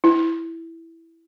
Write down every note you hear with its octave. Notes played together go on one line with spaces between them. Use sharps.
E4